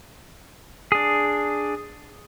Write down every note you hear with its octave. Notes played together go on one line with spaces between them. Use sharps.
D4 G#4